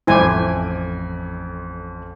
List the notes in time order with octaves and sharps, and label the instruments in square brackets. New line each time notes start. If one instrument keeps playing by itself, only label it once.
[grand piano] A1 F2 D6 [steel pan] E4 C5 G#5